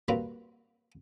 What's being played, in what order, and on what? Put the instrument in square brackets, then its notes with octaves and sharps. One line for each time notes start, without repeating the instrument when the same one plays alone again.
[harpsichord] G3 A#3 C4 F#4 B4